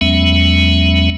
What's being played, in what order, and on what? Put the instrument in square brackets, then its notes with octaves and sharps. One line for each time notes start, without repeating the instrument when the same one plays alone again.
[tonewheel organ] E2 F#3 G#3 B3 C#4 E5